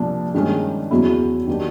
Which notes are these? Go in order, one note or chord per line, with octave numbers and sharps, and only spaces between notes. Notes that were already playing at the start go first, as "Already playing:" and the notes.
Already playing: C2 A#2 F3 A#3 D4
G2 D#3 G#3 C#4
E2 C#3 F#3 B3 E4
D#3 F#3 A#3 D4 G4